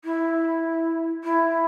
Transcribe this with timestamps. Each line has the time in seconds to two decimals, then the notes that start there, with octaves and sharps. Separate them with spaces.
0.04 E4
1.23 E4